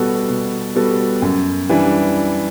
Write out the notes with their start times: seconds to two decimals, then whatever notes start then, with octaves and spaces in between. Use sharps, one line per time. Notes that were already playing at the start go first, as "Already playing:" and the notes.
Already playing: B2 G3 B3 F#4 A4
0.29 B2
0.76 G3 B3 F#4 A4
1.22 F#2
1.69 E3 G3 D4